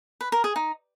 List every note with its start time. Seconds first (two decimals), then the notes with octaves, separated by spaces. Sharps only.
0.21 B4
0.32 A#4
0.44 G#4
0.56 D#4